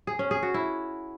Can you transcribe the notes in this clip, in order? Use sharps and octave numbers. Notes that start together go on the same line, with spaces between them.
G#4
C#4
G#4
F#4
E4